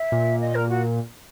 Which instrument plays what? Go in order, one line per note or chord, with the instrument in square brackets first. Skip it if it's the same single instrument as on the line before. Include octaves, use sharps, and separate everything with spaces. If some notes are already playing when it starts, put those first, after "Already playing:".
Already playing: [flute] E5
[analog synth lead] A#2
[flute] D#5
A#4
F#4